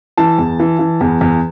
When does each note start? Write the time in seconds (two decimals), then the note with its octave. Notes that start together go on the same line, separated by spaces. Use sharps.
0.18 E3 A5
0.38 E2
0.60 E3
0.79 E3
1.01 E2
1.21 E2